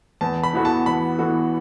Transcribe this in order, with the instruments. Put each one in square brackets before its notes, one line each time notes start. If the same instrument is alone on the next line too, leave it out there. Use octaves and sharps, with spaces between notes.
[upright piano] E2 [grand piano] A5
[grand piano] B5
[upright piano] E3 B3 F#4 A4
[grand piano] A5
[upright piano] E2 [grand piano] B5
[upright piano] E3 B3 F#4 A4